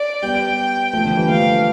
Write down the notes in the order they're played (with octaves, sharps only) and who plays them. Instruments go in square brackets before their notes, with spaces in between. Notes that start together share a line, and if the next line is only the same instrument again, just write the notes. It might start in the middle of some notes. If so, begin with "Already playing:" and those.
Already playing: [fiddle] D5
[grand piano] G3 B3 [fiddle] G5
[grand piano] F3 A3
D3 F3
E3 G3
[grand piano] F3 A3 [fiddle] F5